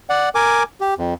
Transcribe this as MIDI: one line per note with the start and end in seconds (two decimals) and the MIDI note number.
0.10 0.29 74
0.10 0.29 78
0.35 0.63 70
0.35 0.63 80
0.35 0.63 86
0.80 0.94 67
0.98 1.14 41